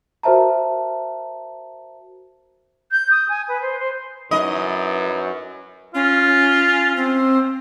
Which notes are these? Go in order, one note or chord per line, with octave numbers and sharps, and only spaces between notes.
F#4 A#4 C5 E5 A5 A#5
G6
D#6
G#5
B4
C5
C5
F#2 F#3 D#4 E4 B4 D#5
C#4 F4
C4